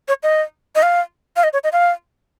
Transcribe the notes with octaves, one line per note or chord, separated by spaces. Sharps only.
C#5
D#5
D#5
F5
F5
D#5
C#5
D#5
F5